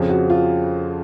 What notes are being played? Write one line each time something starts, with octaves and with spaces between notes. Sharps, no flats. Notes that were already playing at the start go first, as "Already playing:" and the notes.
Already playing: F2 C#3 F3
F#4
F4